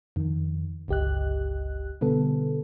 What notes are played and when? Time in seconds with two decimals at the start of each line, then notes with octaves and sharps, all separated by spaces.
0.16 F2 D#3
0.88 G1 C#2 G4 D#5 F#6
2.01 B2 D3 G3 B3 A4